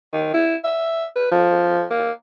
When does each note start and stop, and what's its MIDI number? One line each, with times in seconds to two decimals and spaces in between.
0.13 0.29 51
0.34 0.56 64
0.64 1.05 76
1.16 1.31 71
1.32 1.85 53
1.91 2.11 58